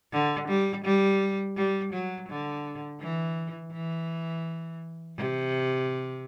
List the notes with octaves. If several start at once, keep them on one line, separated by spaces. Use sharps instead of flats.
D3
G3
G3
G3
F#3
D3
E3
E3
C3